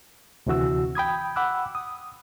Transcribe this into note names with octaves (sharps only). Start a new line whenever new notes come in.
D2 C3 E3 F#4 E6
G5 B5 D#6 G#6
F#5 B5 D6 E6 F#6
D#6